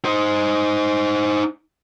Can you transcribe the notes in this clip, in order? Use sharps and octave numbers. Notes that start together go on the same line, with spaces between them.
D#4 C5